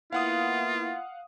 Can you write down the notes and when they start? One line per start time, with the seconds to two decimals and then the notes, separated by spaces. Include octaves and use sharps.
0.13 A#3 B3 E4 F4 F5 F#5 D#6